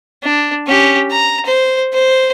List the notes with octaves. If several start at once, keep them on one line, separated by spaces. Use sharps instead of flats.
D4
C#4 G4
A#5
C5
C5